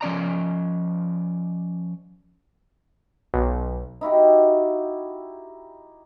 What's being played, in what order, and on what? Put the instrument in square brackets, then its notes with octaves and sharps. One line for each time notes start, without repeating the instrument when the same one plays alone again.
[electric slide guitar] F3 C#4 D5 A#5
[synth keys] B1
[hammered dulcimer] D#4 E4 F#4 G4